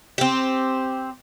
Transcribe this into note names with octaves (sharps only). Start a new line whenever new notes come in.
C4 G4